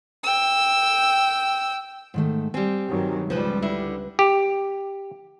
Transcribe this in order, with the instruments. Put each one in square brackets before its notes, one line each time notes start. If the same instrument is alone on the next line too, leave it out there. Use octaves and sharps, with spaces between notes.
[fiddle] G5 E6
[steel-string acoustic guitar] G#2 D#3 A3
[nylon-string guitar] G3 C4 [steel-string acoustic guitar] G#5
[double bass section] G2 D#3 F#3
[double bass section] C#2 G3 [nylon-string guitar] F3 [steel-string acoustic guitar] B4 C5
[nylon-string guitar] D3 E4
[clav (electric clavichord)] G4